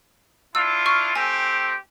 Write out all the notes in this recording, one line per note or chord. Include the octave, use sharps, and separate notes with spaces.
D4 E4 F4 E6
C#6 F6
A3 C4 G4 G#5